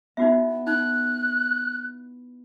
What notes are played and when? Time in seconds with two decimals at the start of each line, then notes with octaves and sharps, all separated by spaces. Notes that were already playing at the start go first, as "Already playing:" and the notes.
0.17 B3 D#4 E4 F#4 E5
0.67 D#4 F#6